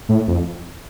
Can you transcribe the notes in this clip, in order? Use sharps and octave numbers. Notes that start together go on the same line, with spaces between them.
A2
F2